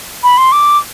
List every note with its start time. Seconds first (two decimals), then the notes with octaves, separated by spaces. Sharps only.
0.23 B5
0.38 C6
0.52 D6